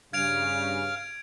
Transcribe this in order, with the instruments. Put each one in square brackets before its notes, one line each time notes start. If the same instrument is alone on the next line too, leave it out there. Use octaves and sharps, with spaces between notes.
[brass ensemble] G2 C#3 [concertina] F5 F6 [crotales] G#6 D7 F7